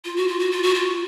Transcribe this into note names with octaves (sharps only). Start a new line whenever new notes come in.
F4
F#4
F4
F#4
F4
F#4
F4